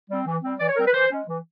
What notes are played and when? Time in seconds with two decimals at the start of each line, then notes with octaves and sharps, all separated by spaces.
0.09 G3 C4
0.25 E3
0.43 G3 C4
0.59 E3 D5
0.68 C#5
0.76 G3 C4 A#4
0.85 B4
0.93 E3 C5
1.11 G#3 C#4
1.27 E3